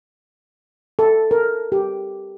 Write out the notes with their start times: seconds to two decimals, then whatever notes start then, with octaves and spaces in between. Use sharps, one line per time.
0.99 A4
1.31 A#4
1.72 G4